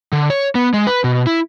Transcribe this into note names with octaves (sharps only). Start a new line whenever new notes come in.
D3
C#5
B3
G#3
B4
B2
E4